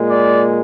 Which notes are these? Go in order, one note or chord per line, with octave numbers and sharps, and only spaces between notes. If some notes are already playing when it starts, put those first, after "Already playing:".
Already playing: A#2 G#3
D5